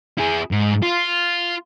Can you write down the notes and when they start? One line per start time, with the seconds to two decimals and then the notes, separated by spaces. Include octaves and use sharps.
0.18 E4 G#4
0.51 G#2
0.82 F4